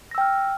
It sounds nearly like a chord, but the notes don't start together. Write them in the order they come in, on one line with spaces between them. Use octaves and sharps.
A#6 E6 G5 F6